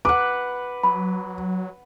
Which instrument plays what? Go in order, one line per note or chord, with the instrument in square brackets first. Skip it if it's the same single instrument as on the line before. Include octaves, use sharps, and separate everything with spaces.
[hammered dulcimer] B4 F#5 [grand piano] D6
[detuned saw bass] F#3 [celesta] B5